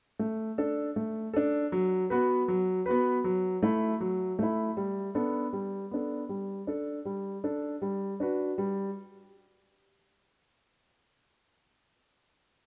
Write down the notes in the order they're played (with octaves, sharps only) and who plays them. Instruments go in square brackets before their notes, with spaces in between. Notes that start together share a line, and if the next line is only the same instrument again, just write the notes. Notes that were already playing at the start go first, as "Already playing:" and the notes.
[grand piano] A3
D4 A4
A3
D4 A4
F#3
B3 F#4 B4
F#3
B3 F#4 B4
F#3
A3 E4
F#3
A3 E4
G3
B3 D4 A4
G3
B3 D4 A4
G3
D4 A4
G3
D4 A4
G3
D4 F#4 B4
G3